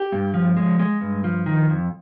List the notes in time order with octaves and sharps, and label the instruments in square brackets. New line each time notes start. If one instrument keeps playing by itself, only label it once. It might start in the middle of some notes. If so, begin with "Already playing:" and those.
Already playing: [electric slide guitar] G4
G2
F3
G#3
G#3
G2
F3
D#3
F2